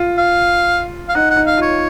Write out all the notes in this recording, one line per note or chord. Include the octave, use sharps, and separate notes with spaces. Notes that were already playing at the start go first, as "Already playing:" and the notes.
Already playing: F4
F5
F5
D#4 F#5
F#5
D#4
F5
F4 C#5